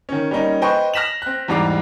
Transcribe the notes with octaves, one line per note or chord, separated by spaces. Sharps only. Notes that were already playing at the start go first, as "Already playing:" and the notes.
D#3 C#4
G3 A#3 C#4 D#4
B4 C5 D#5 G5 C#6
F6 A#6 B6 E7 F#7
C4 F#6
E2 G#2 G3 A#5 D6 C7